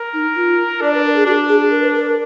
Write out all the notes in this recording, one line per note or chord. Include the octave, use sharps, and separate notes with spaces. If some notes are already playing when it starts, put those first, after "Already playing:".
Already playing: A#4
D#4
F4
D4 D5
B4
A#4
G#4
D4 F#4
G#4
A#4
B4
A#4